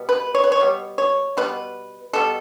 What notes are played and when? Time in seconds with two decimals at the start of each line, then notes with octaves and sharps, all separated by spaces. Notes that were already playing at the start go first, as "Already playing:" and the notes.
Already playing: B2 G3 B3
0.09 B4
0.35 C#5
0.44 B4
0.52 C#5
0.60 B2 G3 B3
0.98 C#5
1.37 B2 G3 B3 B4
2.13 B2 G3 B3 A4